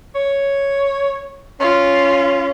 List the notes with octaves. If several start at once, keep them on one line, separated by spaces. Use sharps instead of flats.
C#5
C#4 F4